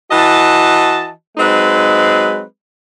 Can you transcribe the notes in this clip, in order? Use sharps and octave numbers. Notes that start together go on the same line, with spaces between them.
E3 F#4 D#5 A5
F#3 G#3 C4 D#4 B4